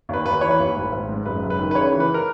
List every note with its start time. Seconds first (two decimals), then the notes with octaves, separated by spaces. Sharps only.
0.09 D#2 B4
0.26 D#2 B4
0.41 E3 C#5
0.51 B4
0.59 D#2
0.76 G#1
0.92 G#1
1.09 G#2
1.26 F#1 B4
1.42 F#1
1.50 B4
1.59 D#3
1.71 B4
1.75 C#3 C#5
1.92 E3
2.00 B4
2.14 A#4